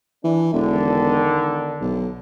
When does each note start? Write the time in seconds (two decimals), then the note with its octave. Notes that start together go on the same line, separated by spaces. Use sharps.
0.24 E3 D4
0.54 E1 D3 D#3
1.81 B1